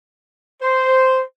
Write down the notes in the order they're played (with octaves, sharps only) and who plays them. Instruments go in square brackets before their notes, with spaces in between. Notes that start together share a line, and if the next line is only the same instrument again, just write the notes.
[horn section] C5